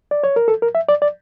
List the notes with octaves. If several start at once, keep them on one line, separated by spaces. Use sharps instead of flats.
D5
C#5
A#4
A4
A#4
E5
D5
D5